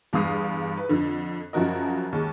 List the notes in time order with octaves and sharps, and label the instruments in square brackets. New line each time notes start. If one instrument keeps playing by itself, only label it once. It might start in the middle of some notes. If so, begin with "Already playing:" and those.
[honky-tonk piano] E2 G2 F5 D#6 C7
B4
F2 D3
F#2 C#3 F3 F#4 A#4 D#5
D#2 G#3